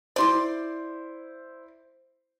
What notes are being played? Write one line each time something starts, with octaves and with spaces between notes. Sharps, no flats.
E4 C5 D5 C6 D6